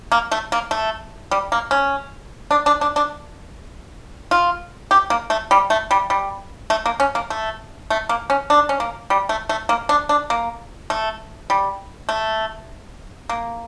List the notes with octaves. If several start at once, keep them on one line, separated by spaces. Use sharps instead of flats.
A#3
A3
A#3
A3
G3
A#3
C#4
D4
D4
D4
D4
F4
G4
A#3
A3
G3
A3
G3
G3
A3
A#3
C#4
A#3
A3
A3
A#3
C#4
D4
C#4
A#3
G3
A3
A3
A#3
D4
D4
A#3
A3
G3
A3
A#3